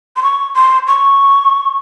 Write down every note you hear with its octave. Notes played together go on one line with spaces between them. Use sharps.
C6
C#6
C6
C#6